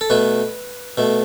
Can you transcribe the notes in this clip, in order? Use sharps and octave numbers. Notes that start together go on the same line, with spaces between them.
A4
B2 A3 B4
B2 A3